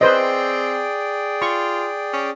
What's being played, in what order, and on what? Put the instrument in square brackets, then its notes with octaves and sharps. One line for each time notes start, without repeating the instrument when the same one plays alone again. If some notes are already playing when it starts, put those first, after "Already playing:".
[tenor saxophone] C4 [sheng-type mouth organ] G#4 D5 G5 [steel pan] B4 C5 D#5
[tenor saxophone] F4 [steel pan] C#6
[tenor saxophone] C#4